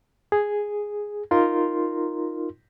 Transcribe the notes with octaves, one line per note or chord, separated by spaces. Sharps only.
G#4
D#4 F4 A#4 C6